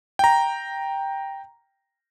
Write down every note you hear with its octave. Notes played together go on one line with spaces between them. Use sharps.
G5 A#5